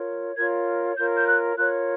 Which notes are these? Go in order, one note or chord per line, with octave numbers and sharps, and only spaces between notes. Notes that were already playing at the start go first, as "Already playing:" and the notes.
Already playing: F4 A#4 C#5
F4 A#4 C#5 G#6
F4 A#4 C#5 G6
G6
F#6
F4 A#4 C#5 F#6